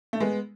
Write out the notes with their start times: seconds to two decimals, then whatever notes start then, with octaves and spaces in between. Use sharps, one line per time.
0.13 A3
0.20 G#3 B3